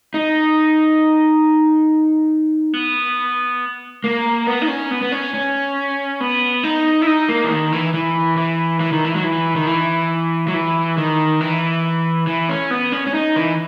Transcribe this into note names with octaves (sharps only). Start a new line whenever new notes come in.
D#4
B3
A#3
B3
D#4
C#4
B3
B3
C#4
C#4
B3
D#4
E4
D#4
A#3
E3
D#3
E3
E3
E3
E3
D#3
E3
F#3
E3
D#3
E3
F#3
E3
D#3
E3
E3
C#4
B3
C#4
C#4
D#4
E3